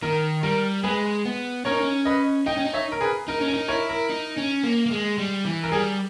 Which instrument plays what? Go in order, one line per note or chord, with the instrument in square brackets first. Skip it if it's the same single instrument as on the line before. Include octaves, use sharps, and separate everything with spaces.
[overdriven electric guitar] D#3 [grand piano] A#4
[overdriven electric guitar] G3 [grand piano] A#4
[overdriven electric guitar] G#3 [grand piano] G#4 B4
[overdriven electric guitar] B3
[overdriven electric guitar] C#4 [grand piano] A#4 C#5
[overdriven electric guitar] D#4
C#4
[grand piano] B4 D#5
[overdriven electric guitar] D#4 [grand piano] D#5 G5
[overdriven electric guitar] C#4
D#4
[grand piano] C#5 E5
A#4
G#4 B4
[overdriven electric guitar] D#4 [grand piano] A#4
[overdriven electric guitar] C#4
[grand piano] A#4
[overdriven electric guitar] D#4
[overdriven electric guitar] E4 [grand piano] A#4 C#5
[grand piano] A#4
[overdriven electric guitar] D#4
C#4
A#3
A#3
G#3
G3
E3
[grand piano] A#4
[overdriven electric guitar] G3 [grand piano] G#4